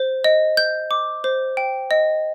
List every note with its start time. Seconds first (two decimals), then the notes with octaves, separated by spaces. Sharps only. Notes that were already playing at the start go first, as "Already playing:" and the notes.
Already playing: C5
0.24 D#5
0.57 G6
0.91 D6
1.24 C5
1.57 G5
1.91 D#5